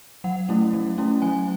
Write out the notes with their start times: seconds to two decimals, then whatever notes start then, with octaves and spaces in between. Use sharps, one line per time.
0.24 F#3 F#5
0.49 A3 C#4 E4
0.73 F#3
0.98 A3 C#4 E4
1.22 F#3 G#5